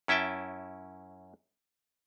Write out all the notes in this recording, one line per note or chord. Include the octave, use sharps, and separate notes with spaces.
F#2 C#4 E4 E5 G5 A5